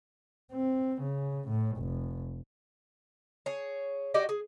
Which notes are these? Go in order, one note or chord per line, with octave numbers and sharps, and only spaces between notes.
C4
C#3
A2
F1
G#4 C#5
F#4 G4 D5 D#5
G#4